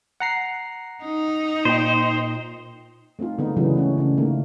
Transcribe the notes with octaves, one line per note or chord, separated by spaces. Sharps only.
F#5 A#5 C7
D#4
A#2 C5 G5
A3 C4 D#4 F4
D3 G#3 B3 D#4
C#3 E3 F#3 G#3 B3 D4
G#3 A3 C#4
C#3 D4
D#3 A3 A#3